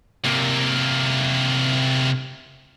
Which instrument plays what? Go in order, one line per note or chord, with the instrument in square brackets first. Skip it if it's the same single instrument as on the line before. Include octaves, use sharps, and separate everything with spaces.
[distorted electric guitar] C3 A#3